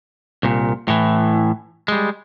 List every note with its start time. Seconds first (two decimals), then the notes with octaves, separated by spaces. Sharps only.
0.43 C2 A#2
0.88 A2 E3
1.88 G3 G#3